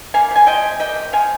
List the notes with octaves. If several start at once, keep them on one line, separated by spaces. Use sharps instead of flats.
A#3 F5 G#5
C3 G#5
F3 D#5 G5
C3
A#3 D#5 G5
C3
F3 F5 G#5